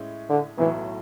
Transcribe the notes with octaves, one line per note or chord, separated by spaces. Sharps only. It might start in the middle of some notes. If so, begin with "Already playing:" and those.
Already playing: A2 G#3 C#4 E4
D3
B1 A2 E3 F#3 A3